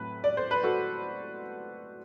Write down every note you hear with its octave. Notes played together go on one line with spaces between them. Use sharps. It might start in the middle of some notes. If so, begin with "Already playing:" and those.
Already playing: A2 F#3 C4 B4
D5
C5
B4
F#4 A4